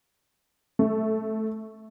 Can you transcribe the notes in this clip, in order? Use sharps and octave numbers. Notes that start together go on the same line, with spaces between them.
A3